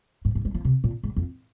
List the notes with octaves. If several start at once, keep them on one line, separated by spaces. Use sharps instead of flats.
G#2
G#2
G#3
F3
C3
A#2
G#2
F2